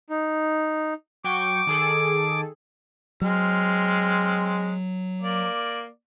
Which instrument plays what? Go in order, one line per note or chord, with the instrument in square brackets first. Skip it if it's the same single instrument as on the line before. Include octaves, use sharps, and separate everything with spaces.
[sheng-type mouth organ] D#4
[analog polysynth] F#3 G5 C#6 [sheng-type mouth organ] D6
[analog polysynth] D#3 G#4 A4
[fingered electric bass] F#3 [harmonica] G#3 C4 F6
[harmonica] A#3 D5